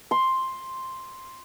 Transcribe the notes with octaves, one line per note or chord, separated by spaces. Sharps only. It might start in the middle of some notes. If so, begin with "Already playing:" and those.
C6